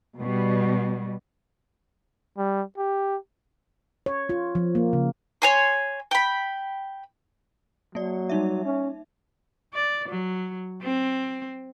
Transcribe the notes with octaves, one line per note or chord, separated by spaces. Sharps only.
B2 G3
G3
G4
C#5
F4
F3
A#3
C#3
C#5 G#5 C6
G5 B5
F#3 A#3 D5
G3 D#4 E5
C#4
D5
F#3
C4